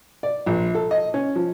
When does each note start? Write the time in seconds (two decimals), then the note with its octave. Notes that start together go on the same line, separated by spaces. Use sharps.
0.23 D5
0.46 A#1
0.75 A4
0.91 D#5
1.14 C#4
1.36 F3